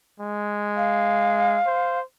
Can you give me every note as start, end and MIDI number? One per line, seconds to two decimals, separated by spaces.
0.20 1.60 56
0.77 1.98 77
1.66 2.03 72